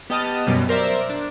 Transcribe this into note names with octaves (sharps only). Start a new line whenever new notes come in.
B3 G4 D#5 A5 F6
F#2 B2 F#3 G3
A#4 C5 D5 E5
D4